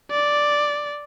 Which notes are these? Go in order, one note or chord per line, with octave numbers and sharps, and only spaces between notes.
D5